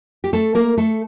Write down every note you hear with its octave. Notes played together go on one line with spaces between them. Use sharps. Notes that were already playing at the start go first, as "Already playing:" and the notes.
G4
A3 A4
A#3 A#4
A3 A4